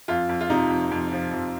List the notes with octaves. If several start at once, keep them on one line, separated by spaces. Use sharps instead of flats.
F2 F4
F2
F4
C3 D#4
F2
F2
F3
F2